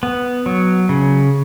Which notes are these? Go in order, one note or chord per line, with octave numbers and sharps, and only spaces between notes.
B3
F#3
C#3